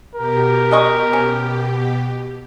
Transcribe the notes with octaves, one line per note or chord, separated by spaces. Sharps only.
B2 G4 A#4
G#3 D#5 C#6
C#4